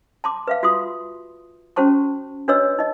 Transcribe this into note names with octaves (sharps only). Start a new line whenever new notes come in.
A5 C6 D6
B4 E5 F5
F4 F#4 C6 D#6
C#4 F#4 C5 A5 C#6
D4 F#4 B4 C#5 D#5 E6
D#4 D#5